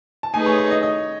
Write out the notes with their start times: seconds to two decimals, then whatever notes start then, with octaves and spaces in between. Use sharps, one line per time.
0.23 A5
0.34 A3 D#4 G#4 B4 G#5
0.46 C#5
0.58 C#5
0.71 D#5
0.83 D#5